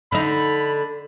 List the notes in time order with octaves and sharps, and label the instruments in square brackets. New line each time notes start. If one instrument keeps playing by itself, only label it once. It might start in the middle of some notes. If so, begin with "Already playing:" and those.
[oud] D3 D#4 [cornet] B5